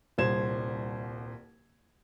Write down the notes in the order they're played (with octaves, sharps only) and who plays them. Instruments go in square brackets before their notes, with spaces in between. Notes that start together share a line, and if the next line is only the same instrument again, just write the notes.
[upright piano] D#1 C2 C5 G#6 E7